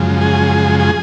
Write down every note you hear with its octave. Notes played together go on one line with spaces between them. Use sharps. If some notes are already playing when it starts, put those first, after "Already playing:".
Already playing: F#2 C#3 F3 G#3
G#4
G#4